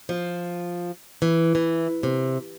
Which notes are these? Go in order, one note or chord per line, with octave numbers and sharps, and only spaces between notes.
F3
E3
E3
C3